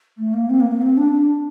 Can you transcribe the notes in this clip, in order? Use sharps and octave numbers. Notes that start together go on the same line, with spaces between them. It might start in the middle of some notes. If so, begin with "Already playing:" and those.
A3
A#3
C4
A#3
A#3
C4
D4
D4